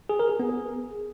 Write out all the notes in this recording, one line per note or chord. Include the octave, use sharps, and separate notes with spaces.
G#4
A#4
G#4
B3
G#4